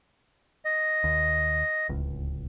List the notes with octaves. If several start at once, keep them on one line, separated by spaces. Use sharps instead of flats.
D#5
D#2
D1 C#2